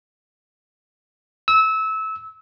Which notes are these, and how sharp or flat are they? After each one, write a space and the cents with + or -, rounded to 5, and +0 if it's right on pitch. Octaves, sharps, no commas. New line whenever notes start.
E6 -25